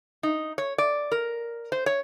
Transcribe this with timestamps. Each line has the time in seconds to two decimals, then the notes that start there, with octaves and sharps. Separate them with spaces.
0.23 D#4
0.58 C#5
0.78 D5
1.12 A#4
1.72 C5
1.86 C#5